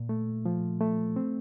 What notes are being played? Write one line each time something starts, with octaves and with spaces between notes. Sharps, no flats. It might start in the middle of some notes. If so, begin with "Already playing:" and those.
Already playing: A#2
A3
F3
A3
C4